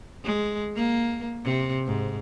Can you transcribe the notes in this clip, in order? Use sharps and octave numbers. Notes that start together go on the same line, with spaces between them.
G#3
A#3
C3
G#2